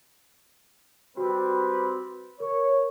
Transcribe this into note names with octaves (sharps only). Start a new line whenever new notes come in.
G3 C4 F#4 B4
A#4 C#5